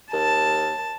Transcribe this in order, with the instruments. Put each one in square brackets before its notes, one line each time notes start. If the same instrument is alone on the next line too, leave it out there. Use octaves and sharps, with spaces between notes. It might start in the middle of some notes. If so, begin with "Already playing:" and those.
[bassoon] D#2 [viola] A5